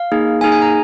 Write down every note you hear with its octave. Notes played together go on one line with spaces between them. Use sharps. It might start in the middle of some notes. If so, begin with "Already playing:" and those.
Already playing: F5
A#3 D#4 G#4
A#3 D#4 G#4 G#5
G#5
A#5